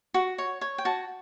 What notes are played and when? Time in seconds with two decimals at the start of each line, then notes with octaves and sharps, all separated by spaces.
0.14 F#4
0.38 C#5
0.61 C#5
0.78 G5
0.85 F#4 A5